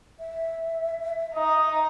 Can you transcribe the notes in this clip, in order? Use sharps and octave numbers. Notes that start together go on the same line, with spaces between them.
E5
D#4 D#5